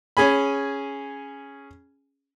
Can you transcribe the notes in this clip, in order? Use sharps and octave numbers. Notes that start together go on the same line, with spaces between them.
C#4 G#4 G#5 B5